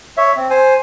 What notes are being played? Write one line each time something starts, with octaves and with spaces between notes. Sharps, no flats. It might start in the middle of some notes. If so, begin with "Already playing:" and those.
C#5 E5
C4
C5 G#5